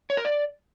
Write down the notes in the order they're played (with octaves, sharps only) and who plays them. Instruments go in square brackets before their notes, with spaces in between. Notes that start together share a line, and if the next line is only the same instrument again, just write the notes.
[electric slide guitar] C#5
A#4
D5